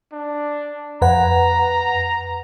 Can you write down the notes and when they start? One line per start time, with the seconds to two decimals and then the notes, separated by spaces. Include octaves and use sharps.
0.13 D4
1.02 F2 B4 F#5 A#5